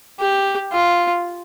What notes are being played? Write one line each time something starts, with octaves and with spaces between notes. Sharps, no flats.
G4
F4